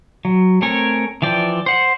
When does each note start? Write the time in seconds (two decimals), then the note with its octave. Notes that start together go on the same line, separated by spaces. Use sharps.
0.25 F#3
0.62 A3 C4 A#4 C#5 G#5
1.22 E3 F3 D5 G5
1.66 C5 F#5